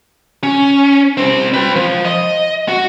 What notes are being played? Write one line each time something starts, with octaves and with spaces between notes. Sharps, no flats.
C#4
C2 C4
B4 G5
F3
D#5
F#4